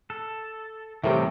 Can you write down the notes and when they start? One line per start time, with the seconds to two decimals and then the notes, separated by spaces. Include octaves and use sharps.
0.10 A4
1.04 A2 C3 E3 G3 C4 G4 A#4 E5